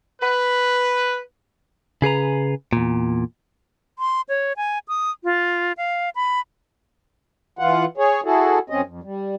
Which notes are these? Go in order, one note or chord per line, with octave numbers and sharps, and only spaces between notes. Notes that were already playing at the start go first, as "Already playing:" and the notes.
B4
C#3 G#4 B4 A#5
E2 A#2
C6
C#5
G#5
D#6
F4
F5
B5
E3 F4 F#5
G#4 C#5
E4 F#4 G#4 A4
F#2 C4 C#4 D#5
F2
G3